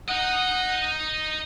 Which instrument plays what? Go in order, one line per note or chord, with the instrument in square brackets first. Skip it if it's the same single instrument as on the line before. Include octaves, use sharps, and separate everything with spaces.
[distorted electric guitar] D#4 D#5 [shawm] F#5